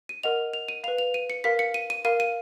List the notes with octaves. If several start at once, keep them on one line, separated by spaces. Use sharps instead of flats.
D#7
A#4 D#5 F#5 F7
F7
D#7
B4 F5 F7
F7
D#7
C#7
A#4 F5 B6
C#7
D#7
D#7
A#4 F5 D#7
D#7